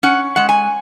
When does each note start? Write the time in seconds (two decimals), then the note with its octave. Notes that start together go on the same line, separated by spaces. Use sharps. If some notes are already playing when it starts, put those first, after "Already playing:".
0.03 C#4 F#5
0.36 G#3 F#5
0.49 G#5